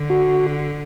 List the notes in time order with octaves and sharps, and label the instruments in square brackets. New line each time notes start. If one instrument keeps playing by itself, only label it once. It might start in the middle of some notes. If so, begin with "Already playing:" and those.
Already playing: [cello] D3
[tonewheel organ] F#4